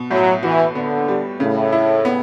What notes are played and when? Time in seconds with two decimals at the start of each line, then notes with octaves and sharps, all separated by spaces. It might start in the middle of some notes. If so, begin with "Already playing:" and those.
Already playing: B2
0.11 A2 F#3
0.43 E3 F#4
0.75 D3 B3
1.08 G3
1.40 A2 C#3
1.73 E4
2.05 B3